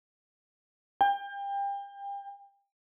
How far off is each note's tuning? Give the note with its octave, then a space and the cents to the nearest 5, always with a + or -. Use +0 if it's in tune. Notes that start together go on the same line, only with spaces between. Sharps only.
G5 +30